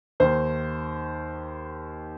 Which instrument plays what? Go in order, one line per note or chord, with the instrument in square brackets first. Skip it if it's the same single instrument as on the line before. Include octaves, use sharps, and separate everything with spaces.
[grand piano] D#2 D#3 C5